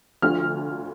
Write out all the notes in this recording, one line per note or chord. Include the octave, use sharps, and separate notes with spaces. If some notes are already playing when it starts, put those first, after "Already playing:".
D2 D3 F3 F6